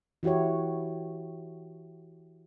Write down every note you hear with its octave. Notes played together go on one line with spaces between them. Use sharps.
E3 E4 F#4 G4 C#5